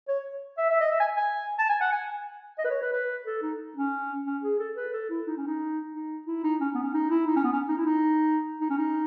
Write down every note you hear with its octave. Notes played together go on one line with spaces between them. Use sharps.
C#5
E5
E5
D#5
E5
G#5
G#5
A5
G#5
F#5
G#5
D#5
B4
C#5
B4
B4
A4
D#4
C#4
C#4
G#4
A4
B4
A4
E4
D#4
C#4
D#4
D#4
E4
D#4
C#4
B3
C#4
D#4
E4
D#4
C#4
B3
C#4
D#4
E4
D#4
D#4
C#4
D#4